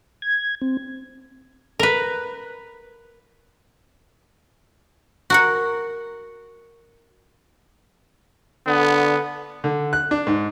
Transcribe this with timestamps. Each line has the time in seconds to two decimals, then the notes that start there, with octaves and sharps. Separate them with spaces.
0.22 G#6
0.62 C4
1.79 A#4 B4
5.30 F#4 A#4 F#5
8.67 D3 B3
9.64 D3
9.93 F#6
10.11 D4
10.27 G#2